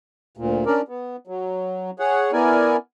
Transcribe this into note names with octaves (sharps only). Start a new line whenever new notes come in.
D2 A#2
C#4 D4 A#4 D5
B3
F#3
G#4 C#5 F#5
B3 E4 A#4 D5 G#5